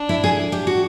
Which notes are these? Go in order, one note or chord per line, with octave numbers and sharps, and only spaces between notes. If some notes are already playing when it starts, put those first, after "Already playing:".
Already playing: D4
E4
G#4
G4
F#4